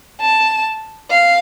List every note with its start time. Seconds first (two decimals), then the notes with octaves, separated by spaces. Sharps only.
0.21 A5
1.10 F5